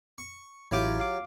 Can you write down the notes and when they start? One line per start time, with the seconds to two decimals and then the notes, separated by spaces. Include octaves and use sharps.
0.18 C#6
0.71 A1 F#3 E4 F4 G4 D6
1.00 F5 D6